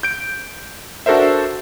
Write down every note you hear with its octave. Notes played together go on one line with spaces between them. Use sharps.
G6 D7
D4 F#4 A4 A#4 C5 E5